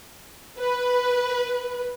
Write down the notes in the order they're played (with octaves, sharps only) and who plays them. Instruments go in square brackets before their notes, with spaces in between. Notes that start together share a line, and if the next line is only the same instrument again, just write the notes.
[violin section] B4